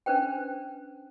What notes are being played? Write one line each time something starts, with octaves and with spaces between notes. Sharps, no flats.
C#4 D4 B4 C5 G5